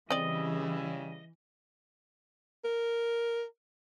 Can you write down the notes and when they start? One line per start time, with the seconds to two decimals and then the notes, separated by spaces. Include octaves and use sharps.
0.10 C#3 E3 G3 C4 E4 D5 D#5
2.65 A#4